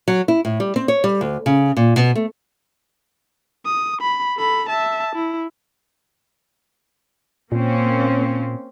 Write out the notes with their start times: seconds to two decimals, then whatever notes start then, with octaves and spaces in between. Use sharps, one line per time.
0.08 F#3
0.28 E4
0.45 A2
0.60 G3
0.76 C4
0.88 C#5
1.04 G3
1.21 D2
1.46 C#3
1.77 A#2
1.96 B2
2.16 A3
3.66 D#6
4.01 B5
4.37 A4 B5
4.69 E5 A5
5.15 E4
7.52 A#2 A#3 C4 C#4